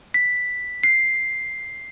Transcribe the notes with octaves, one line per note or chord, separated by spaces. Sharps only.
B6
C7